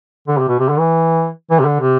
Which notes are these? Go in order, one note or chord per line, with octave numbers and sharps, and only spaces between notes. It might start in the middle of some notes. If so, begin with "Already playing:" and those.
D3
C3
B2
C3
D3
E3
E3
C3
D3
C3